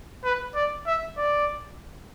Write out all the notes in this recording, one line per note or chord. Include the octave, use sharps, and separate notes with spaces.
B4
D5
E5
D5